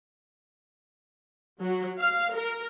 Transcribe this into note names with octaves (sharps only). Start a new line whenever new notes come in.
F#3
F5
A#4